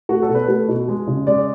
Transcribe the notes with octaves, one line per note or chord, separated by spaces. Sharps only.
A3 F#4
A4
B2
B4
A3
B2
G#3
C#3
G#3 D5